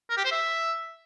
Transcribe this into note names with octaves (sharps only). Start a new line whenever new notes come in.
A#4
G4
C5
E5